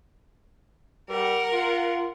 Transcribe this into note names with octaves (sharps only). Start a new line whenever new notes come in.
G3 A#4 F#5
F4